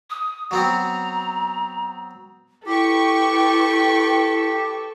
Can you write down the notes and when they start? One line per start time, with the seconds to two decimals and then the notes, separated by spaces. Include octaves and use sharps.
0.10 D#6
0.51 F#3 B3 C4 A#5
2.66 E4 G4 A4 B4 G5 C#6